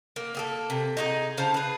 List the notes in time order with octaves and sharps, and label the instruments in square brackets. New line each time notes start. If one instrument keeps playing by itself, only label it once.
[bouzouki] A#3
A#3 G#4 A4
C3
D#4 F4 G#4
C#3 C5 F5 A5
G#4 B4